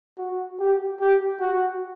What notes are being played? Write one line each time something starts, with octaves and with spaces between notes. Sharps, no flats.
F#4
G4
G4
F#4